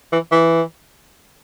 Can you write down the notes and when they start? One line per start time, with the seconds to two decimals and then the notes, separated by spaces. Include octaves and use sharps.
0.12 E3
0.32 E3